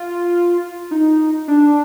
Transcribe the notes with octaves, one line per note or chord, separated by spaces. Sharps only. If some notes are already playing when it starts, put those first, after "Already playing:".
Already playing: F4
D#4
D4